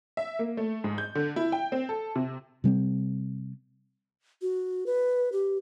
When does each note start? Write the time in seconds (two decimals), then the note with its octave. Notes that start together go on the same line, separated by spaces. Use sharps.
0.17 E5
0.39 A#3
0.57 A3
0.84 G#2
0.98 G6
1.15 D3
1.36 E4
1.52 G5
1.72 C4
1.89 A4
2.16 C3
2.64 C3 G3 A#3 C4
4.42 F#4
4.86 B4
5.32 G4